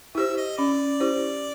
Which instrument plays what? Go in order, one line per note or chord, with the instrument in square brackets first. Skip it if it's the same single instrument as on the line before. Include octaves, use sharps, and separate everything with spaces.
[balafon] E4 G4 C5 [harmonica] E5
[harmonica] D#5
[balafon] C#4 [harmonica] D5
[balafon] E4 G4 C5